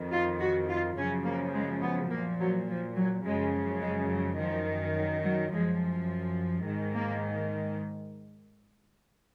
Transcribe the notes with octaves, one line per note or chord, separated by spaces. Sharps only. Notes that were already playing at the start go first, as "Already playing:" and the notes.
Already playing: F2 D#3
F4
F#4
F4
F#2 C#3 F3 C#4
A#3
G#3
B3
A#2 F3 A#3
F#3
F3
F#3
F#2 C#3 F3 G#3
G#3
F#3
F#2 D#3 F3
F#3
F#3
F#2 F3 G#3
G#2 D#3
A#3